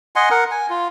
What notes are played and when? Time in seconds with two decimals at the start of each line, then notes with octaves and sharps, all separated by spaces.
0.16 D#5 F#5 G#5 C6
0.31 A#4 F#5
0.51 G#5
0.70 F4